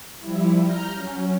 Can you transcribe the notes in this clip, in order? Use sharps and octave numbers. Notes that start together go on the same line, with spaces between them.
F3 G3 E4
A#5 F6 G6
F#3 C#4